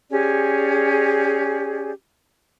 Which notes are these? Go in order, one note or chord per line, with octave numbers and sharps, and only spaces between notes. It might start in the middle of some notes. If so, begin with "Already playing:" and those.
C#4 G4 G#4 D5